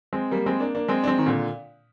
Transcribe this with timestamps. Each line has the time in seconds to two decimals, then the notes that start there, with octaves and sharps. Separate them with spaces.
0.13 G#3 C4
0.31 G3 A#3
0.46 G#3 C4
0.60 A#3 D4
0.75 A#3 D4
0.88 G#3 C4
1.04 D4
1.07 G#3 C4
1.18 D#3
1.26 A#2 D3